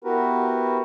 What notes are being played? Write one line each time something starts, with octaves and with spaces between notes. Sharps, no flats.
B3 E4 F#4 G4 A#4 B4